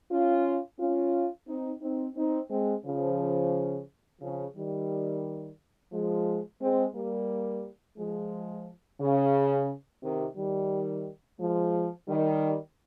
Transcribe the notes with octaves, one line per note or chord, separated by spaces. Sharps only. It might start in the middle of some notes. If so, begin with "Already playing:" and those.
C#4 F4
C#4 F4
C4 D#4
C4 D#4
C4 D#4
G#3 C4
C#3 F3
C#3 F3
D#3 G3
F3 G#3
G#3 C4
G3 A#3
F3 G#3
C#3
C3 D#3
D#3 G3
F3 G#3
D#3 G3